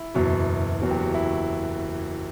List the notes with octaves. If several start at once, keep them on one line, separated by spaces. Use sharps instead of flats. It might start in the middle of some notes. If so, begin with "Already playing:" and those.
Already playing: E4
F#1 E2 B2 F#3
F#1 E2 B2 F#3 F#4
G4
F#4
E4